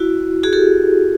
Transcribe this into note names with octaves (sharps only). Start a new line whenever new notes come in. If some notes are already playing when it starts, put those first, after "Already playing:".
Already playing: E4 F#4
F#4 G#4
G4 A4